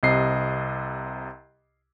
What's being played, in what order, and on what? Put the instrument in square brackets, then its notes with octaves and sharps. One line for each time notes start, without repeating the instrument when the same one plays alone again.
[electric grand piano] C2 C3 D#5 C7